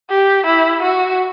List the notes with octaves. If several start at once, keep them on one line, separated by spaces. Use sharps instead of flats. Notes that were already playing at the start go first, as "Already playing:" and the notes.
G4
E4
F#4